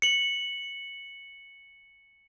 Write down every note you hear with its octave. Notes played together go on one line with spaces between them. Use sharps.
C#7 F#7